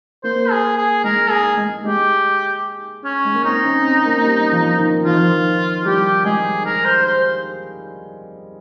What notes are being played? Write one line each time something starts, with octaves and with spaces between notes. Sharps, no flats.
A#3 C5
G#4
G#4
G#3 A#4
G#4
G#3
G#3 G4
C#4
G#3
A#3
C4 D#4
C#4
C4
A#3
G3
F3
D#3
F3 F4
D#3
F3
G3 G4
G#3 G#4
A#4
C5
C5